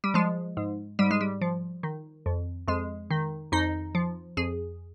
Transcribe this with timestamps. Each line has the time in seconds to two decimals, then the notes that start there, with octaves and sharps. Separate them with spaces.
0.04 G3
0.14 F3 G#3
0.57 G#2
0.99 G#2 G3
1.11 G#3
1.21 G3
1.41 F3
1.83 D#3
2.26 F2
2.68 F2 G#3
3.11 D#3
3.52 F2 D#4
3.95 F3
4.37 F2 G#4